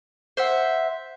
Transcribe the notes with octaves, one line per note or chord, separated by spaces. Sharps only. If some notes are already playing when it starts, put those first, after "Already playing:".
C5 E5 F#5